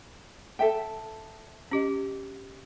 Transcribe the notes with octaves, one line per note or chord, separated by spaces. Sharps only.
A4 E5 G5
C#4 G4 D#5